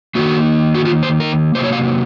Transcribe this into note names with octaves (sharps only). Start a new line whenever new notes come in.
D#3 A#3 F#4
F#4
F4
C5
A#4
C3 F#3 A#3 C5
C#5
F5